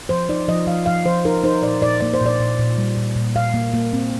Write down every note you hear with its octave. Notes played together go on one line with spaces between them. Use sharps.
F3 C5
D#4 D5
F3 D#5
F3 F5
F3 F5
F3 C5
D#4 A#4
D#4 C5
A#2 D5
A#2 D5
A#3 D5
C5
A#2
D5
A#2
A#2
G3
A#2
A#2
A#2 F5
A#3
A#3
C4